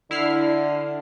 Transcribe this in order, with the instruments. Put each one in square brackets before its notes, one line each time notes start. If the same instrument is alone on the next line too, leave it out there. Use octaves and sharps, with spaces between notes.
[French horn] D3 [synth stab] E4 F6 C7